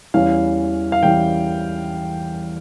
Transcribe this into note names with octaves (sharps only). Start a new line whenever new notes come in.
E2 E3 G3 C#4 E4 F5
F5
E2 E3 G3 C#4 E4 G5